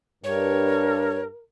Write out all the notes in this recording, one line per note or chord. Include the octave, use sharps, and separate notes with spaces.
G2 A#4 C#5